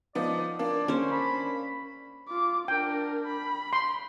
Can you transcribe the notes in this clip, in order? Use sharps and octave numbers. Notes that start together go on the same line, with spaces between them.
F3 B3 D#4 D5
A#3 D4 D5
C#4 C5
B5
F4 D6
D4 A#4 G5
B5
C6